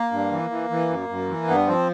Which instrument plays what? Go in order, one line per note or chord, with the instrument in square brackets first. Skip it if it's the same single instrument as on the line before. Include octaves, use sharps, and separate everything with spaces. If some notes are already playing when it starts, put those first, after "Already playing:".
Already playing: [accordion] A#3
G2
E3
E3
E3
F#2
F#2
E3
G2 B3
F3 C4